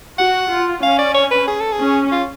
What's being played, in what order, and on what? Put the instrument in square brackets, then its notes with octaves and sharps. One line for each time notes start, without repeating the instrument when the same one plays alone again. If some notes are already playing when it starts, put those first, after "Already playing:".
[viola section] F#4 [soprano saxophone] F#5
[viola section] F4
[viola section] C#4 [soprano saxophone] F5
[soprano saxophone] D5
C#5
B4
G#4
A4
G#4
[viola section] C#4
[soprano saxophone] F4